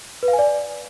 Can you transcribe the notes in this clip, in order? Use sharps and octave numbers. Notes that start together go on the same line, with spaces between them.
B4
F5
G#5
D5